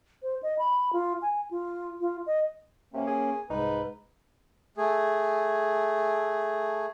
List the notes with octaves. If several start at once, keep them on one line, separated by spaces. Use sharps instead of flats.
C5
D#5
B5
F4
G#5
F4
F4
D#5
C3 A#3 C#4
G#4
C2 G#2 D#4 B4
A3 G#4